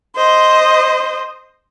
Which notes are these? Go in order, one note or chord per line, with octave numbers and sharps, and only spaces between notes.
C5 D#5